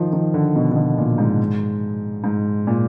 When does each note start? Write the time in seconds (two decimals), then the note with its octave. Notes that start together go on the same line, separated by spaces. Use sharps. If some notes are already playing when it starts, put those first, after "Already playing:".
Already playing: D#3 F3
0.13 D#3
0.34 D3
0.55 B2
0.71 D3
0.76 B2
0.98 A#2
1.18 G#2
2.24 G#2
2.67 A#2